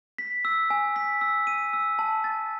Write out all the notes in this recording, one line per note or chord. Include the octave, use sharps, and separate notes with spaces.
B6
E6
G#5
B6
E6
D#7
E6
A5
A6